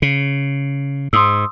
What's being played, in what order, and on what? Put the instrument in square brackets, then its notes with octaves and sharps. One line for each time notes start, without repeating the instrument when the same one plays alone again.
[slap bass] C#3
[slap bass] G#2 [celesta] C6 D#6 E6